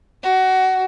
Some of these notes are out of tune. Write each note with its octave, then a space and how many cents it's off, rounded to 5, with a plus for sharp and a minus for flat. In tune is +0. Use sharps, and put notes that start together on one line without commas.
F#4 +20